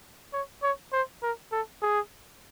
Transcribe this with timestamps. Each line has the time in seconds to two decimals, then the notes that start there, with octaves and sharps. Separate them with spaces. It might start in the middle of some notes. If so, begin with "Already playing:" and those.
0.33 C#5
0.63 C#5
0.93 C5
1.22 A#4
1.52 A4
1.82 G#4